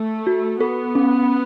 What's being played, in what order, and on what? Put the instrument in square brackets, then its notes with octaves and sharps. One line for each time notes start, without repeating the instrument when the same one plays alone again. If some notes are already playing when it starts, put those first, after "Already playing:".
Already playing: [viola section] A3 [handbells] A4
[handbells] F#4
[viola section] B3 [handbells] A4
[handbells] C#4